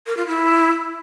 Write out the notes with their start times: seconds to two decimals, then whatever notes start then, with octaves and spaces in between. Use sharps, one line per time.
0.07 A#4
0.17 F4
0.27 E4